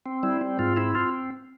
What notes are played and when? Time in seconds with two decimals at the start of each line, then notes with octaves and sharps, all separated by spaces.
0.06 C4
0.23 G3 E4
0.41 C4
0.59 G#2 F4
0.76 C4 E4
0.95 C4 F4